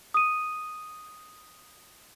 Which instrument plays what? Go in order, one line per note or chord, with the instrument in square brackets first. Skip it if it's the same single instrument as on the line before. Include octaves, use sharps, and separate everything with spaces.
[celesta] D#6 D#7